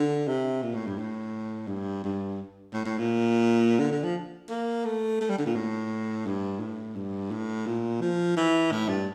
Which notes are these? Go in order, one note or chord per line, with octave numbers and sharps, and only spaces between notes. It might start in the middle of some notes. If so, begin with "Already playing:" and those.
Already playing: D3
C3
A#2
A2
G2
A2
G2
G2
A2
A2
A#2
D3
D3
F3
A#3
A3
A3
G3
D3
A#2
A2
G2
A2
G2
A2
A#2
F3
E3
A2
G2